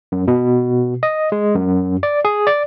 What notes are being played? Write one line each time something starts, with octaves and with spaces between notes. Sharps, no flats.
F#2
B2
D#5
G#3
F#2
D5
G#4
D5